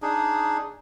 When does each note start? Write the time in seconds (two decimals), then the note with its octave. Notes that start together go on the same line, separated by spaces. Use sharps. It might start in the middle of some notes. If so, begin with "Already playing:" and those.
0.02 D4 D#4 G#4